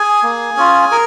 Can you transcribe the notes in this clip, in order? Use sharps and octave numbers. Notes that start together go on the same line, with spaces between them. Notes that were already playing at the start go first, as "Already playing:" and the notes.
Already playing: G#4 G#5
A#3
C#4 F4
A#4